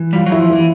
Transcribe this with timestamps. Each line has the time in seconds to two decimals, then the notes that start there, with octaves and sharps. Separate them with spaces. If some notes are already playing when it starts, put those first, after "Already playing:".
Already playing: E3
0.13 G3 F4
0.26 F#3
0.32 E4
0.39 F3
0.49 E4
0.53 E3